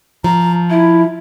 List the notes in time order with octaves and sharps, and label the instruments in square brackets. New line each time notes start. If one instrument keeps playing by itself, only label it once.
[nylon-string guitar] F3 [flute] A#5
[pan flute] E4 [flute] E5